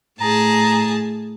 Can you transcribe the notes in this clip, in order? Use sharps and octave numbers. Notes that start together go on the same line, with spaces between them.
A2 G#4 A5 A#5